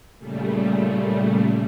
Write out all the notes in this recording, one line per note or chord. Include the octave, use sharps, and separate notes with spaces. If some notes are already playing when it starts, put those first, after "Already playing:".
A#2 C#3 G3 A3